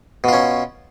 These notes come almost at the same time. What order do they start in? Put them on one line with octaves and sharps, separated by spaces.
B2 F4 C#4